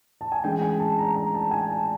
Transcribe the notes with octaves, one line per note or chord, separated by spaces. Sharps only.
A5
G#5
E3 G#3 C#4 G5
G#5
A5
A#5
A#5
A5
G#5
A5